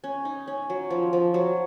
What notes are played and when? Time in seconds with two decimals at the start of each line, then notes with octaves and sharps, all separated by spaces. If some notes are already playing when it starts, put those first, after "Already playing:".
0.04 C#4
0.25 D#4
0.48 C#4
0.70 F#3
0.90 F3
1.13 F3
1.34 F#3